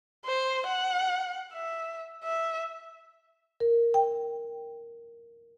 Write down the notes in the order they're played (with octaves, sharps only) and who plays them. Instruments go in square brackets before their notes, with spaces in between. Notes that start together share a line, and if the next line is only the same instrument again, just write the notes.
[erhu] C5
F#5
E5
E5
[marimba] A#4
G5